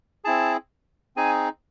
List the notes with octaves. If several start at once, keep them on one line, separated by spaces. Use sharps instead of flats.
C4 E4 G#4 A5
C4 D#4 G#4 G#5